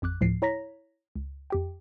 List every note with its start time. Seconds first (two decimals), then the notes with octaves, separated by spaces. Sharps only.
0.02 A1 F2 D6 F#6
0.21 D2 A2 F3 C7
0.42 E4 C#5 A#5 A#6 B6
1.15 C#2
1.50 F2 G4 G5